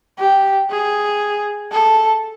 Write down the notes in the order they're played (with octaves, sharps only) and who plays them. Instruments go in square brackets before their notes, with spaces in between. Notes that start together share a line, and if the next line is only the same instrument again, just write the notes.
[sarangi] G4
G#4
A4